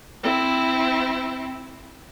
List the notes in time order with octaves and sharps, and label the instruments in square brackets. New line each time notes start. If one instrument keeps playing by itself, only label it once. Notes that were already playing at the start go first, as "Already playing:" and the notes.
[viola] C4 E4